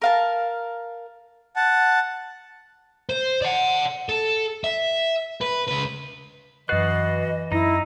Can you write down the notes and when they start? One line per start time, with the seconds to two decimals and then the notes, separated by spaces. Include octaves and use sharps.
0.02 A#4 F5 A5
1.56 F#5 A5
3.09 C5
3.42 D5 F#5
4.09 A4
4.64 E5
5.41 B4
5.67 C#2 B4
6.69 F#2 E3 F#4 B4 D#5 F#6 A6 C7
7.52 F#2 D#4 E4 A#6